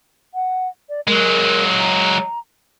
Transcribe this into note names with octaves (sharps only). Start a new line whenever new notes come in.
F#5
D5
F#3 G#3 A#4
A#5